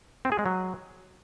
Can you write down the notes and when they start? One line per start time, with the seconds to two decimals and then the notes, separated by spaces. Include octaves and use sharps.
0.25 C4
0.32 G#4
0.39 G#3
0.46 F#3